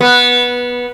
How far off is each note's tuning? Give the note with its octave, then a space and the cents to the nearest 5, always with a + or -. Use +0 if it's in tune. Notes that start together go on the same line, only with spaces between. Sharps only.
B3 -15